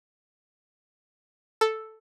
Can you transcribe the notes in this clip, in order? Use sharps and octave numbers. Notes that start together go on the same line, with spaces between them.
A4